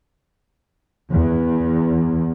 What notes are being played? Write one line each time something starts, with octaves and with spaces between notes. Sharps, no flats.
E2